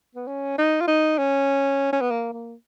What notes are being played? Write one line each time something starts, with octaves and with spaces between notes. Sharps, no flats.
B3
C#4
D#4
F4
D#4
C#4
C#4
B3
A#3
A#3